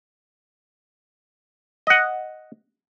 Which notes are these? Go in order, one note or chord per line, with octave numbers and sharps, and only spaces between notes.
D#5 F#5